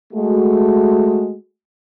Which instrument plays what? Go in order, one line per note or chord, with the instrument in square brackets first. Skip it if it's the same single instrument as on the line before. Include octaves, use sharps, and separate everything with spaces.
[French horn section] G#3 A3 F#4